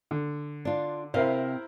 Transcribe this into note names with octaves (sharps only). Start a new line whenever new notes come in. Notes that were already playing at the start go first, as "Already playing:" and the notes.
D3
D4 F4
C3 E4 A#4 C5 F5